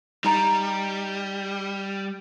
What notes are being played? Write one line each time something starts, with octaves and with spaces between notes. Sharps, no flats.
G3 D#4 A#5